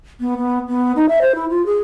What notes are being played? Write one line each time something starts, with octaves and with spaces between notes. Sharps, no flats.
B3
B3
B3
D#4
E5
C5
E4
F4
G#4